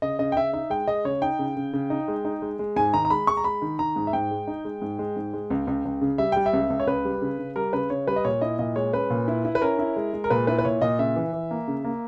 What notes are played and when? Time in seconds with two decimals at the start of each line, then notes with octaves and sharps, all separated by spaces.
0.02 C#3 D#5
0.19 C#3 D#5
0.32 G5
0.36 C#3 E5
0.53 D#4 E5
0.70 G#3 G5
0.88 G#3 D#5
1.05 C#3 C#5
1.22 D#4 G5
1.39 C#3
1.57 C#3
1.73 C#3
1.90 D#4
2.08 G#3
2.25 D#4
2.42 G#3
2.59 G#3
2.76 G#2 G#5
2.93 D#3 A#5
3.05 A#5
3.10 G#3 B5
3.27 G#3 C#6
3.37 A#5
3.44 G#3 B5
3.62 D#3
3.79 D#3 A#5
3.96 G#2
4.07 E5
4.13 G#2 G5
4.31 G#3
4.47 D#4
4.65 G#3
4.82 G#2
4.99 G#3
5.16 G#2
5.33 G#3
5.50 C#2
5.67 C#2
5.85 C#2
6.01 C#3
6.18 G3 E5
6.32 G3 G5
6.46 E5
6.53 C#2
6.70 C#2
6.80 C#5
6.87 C#2 B4
7.05 G3
7.22 C#3
7.39 C#3
7.56 G3 A#4
7.73 C#3 B4
7.90 C#3 C#5
8.07 G3 B4
8.16 D#5
8.25 A#2 C#5
8.41 E4 D#5
8.59 A#2 D#5
8.76 G#3 C#5
8.93 C#4 B4
9.10 A#2
9.28 E4
9.45 E4
9.55 B4
9.62 C#4 A#4
9.79 E4
9.96 G#3
10.13 G#3
10.24 A#4
10.30 A#2 B4
10.47 E4 B4
10.59 B4
10.65 A#2 C#5
10.82 A#2 D#5
10.99 C#3 E5
11.16 E3
11.33 E3
11.51 A#3
11.68 C#3
11.85 A#3